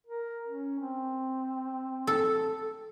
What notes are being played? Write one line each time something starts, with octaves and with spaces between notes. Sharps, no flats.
A#4
C#4
C4
A4